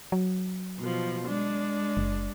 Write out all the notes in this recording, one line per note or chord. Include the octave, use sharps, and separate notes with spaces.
F#3
B2 F3
G#3 D4
F#1